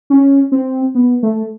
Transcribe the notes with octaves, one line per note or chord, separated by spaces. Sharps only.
C#4
C4
B3
A3